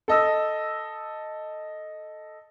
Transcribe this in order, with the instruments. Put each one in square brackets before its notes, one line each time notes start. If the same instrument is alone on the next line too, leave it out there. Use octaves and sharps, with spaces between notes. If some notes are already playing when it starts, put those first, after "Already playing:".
[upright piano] A4 D#5 E6